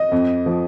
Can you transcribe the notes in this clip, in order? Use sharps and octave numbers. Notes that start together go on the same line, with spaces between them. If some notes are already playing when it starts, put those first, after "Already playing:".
Already playing: D#5
F2
F3